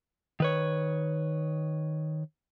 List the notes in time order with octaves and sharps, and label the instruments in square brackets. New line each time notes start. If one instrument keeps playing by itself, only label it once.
[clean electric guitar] D#3 B4 C#5